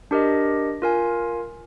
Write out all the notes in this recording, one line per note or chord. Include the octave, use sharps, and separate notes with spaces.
D4 G4 A#4 D#5
F4 A#4 F5 G#5